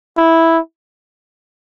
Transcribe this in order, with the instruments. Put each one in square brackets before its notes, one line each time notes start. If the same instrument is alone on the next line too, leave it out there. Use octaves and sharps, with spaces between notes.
[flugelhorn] E4